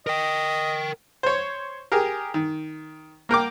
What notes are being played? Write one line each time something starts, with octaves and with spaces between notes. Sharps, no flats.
A#4 D#5 G5
C5 C#5
G4 G#4 A#4
D#3
A#3 A#4 G5 D6